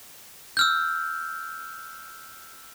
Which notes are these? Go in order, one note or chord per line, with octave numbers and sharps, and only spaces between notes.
E6 F6 G6